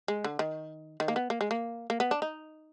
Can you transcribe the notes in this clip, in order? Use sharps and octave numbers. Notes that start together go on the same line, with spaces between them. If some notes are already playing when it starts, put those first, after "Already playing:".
G#3
D3
D#3
D#3
A#3
B3
A#3
G#3
A#3
A#3
B3
D4
D#4